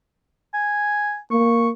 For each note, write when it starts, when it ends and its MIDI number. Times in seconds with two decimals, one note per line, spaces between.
0.54 1.19 80
1.31 1.71 58
1.31 1.69 85